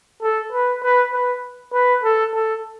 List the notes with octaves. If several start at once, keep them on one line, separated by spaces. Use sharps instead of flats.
A4
B4
B4
B4
B4
A4
A4